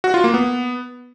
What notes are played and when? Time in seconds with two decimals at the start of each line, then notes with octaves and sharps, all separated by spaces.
0.04 F#4
0.14 F4
0.24 A#3
0.34 B3